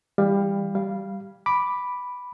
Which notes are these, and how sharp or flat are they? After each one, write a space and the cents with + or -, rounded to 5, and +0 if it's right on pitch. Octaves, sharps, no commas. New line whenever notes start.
E3 +0 G3 +25 F5 +0
G3 +0 F5 -10
B5 +0 D6 +0